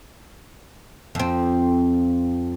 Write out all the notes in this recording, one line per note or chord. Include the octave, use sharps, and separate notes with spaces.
F2 C4